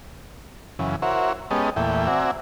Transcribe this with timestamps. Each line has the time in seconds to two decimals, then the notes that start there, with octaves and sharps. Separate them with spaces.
0.79 F#2 C#3 E3
1.02 E4 F#4 A#4 C5 C#5
1.51 G#3 B3 C#4 G4 D#5 A5
1.76 E2 A#2 A3 E4 G5
2.07 C4 F#4 D5 E5 G#5 A#5